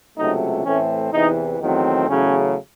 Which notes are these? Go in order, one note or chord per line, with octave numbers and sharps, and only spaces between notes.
C#2 C3 F#3 A3 D#4
A2 E3 A3 C4 C#4
E2 C3 E3 D#4
E2 D#3 F#3 A3 C4
E2 C#3 F#3 A3 C#4